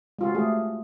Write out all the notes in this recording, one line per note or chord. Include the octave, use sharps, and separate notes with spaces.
G#3 F4 F#4
A3 G4 G#4